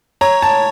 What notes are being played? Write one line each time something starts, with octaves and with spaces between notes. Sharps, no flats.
C#5 A#5
A5